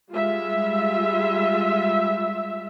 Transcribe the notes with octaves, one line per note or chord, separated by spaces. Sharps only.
G3 G#3 F4 E5